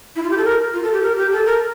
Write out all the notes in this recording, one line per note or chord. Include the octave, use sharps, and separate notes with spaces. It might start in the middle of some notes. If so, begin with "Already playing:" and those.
E4
F4
G4
A4
A#4
F4
A4
G4
A#4
G4
A4
A#4